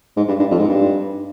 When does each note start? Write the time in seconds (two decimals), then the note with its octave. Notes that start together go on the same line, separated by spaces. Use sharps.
0.17 G#2
0.28 G2
0.40 G2
0.51 F2
0.59 G#2
0.69 G2